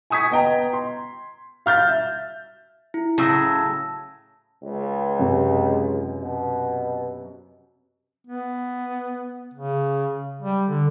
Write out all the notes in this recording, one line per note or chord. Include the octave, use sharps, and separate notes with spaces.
G#5 C#6 D#6 G#6 B6
B3 D#5 G5 A#5
C6
F5 F6 G6 A6
E5
E4
A2 C#3 F#3 A5 E6 A#6
C#2
F#2 C3
B2
B3
C#3
G3
D3